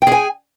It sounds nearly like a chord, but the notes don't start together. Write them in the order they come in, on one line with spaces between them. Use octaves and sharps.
G5 G#4 G#5